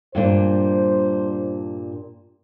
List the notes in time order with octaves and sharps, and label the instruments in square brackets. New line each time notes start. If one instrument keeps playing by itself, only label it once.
[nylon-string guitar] G2 A#2 D4 [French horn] C5